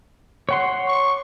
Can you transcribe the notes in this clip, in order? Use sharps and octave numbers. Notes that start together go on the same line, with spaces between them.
C#5 F#5 C6
C#6